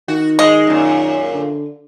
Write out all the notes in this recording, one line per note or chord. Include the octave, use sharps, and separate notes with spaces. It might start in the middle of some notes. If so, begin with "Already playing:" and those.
D#3 F#4
G#3 D#5
F#2 A#2
D3